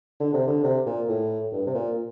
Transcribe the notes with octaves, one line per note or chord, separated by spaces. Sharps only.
D3
C3
D3
C3
A#2
A2
G2
C3
A#2